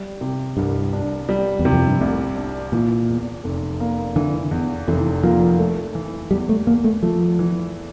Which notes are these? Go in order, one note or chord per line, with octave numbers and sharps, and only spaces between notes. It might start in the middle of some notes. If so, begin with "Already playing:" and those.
Already playing: G3
C3
C2 G2
D4
G3
E2
C3
F2
G2
C2 A2
D4
A#2 E3
E2
F1
A#3
D3 E3
E2
F1 E3
F3 A#3
A3
E3
E2 G3
A3
E2 A#3
A3
F3 A3
E3